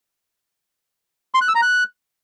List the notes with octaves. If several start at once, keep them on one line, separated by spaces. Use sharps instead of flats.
C6
F#6
E6
A#5
F#6